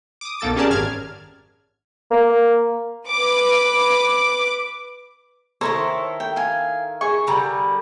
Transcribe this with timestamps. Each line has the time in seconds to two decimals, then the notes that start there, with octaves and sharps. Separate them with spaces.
0.21 D6 D#6
0.40 B1 A#3 A4 A6 D7
0.56 C#4 G4 G#4 A#4 D5 A5
0.69 G#1 F#2 F6 G#6
2.11 A#3
3.08 B4 D6
5.61 D#3 E4 A4 C5 C#5 A#5
6.20 G5
6.36 F5 G#5
7.01 G#4 G#5 C#6
7.27 D3 G3 A#4